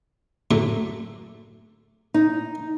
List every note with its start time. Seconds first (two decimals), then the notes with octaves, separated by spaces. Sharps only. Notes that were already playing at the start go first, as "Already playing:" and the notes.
0.51 F#2 A2 D3
2.14 D#4